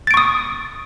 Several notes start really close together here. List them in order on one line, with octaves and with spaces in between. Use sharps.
A6 D7 C#6 D#6